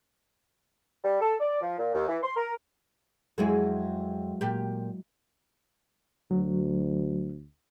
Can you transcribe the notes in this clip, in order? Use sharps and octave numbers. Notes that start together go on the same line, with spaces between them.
G3
A4
D5
F3
A#2
D#2
E3
C6
A#4
F2 F#3 G#3 E4 G#4 A4
A#2 G4
D2 F#3